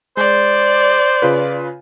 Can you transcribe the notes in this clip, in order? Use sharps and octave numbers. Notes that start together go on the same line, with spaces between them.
G#3 C5 D5
C#3 F4 B4